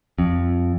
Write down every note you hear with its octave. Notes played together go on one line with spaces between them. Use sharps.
F2